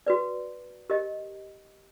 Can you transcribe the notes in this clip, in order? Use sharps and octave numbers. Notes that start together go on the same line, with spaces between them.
F#4 B4 D5
G4 A#4 D#5